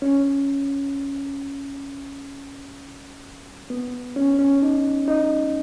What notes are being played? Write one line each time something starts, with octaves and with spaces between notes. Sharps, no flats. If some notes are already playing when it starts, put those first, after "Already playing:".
C#4
B3
C#4
C#4
D#4
D#4